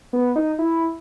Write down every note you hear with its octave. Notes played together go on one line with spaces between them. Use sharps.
B3
D#4
E4